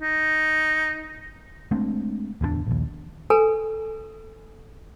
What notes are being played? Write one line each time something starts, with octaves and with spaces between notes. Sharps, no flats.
D#4
G#3 A3 C4 D4
D1 E2 G3 D4
A#1 D#2
A4 B4 G#5 A#5